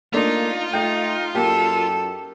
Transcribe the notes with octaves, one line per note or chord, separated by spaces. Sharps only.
A3 A#3 D4 D#4 F4
A3 D#4 G5
F#2 A#3 G4 A4